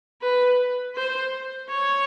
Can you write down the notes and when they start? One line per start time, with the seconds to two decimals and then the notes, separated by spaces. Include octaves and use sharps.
0.22 B4
0.96 C5
1.69 C#5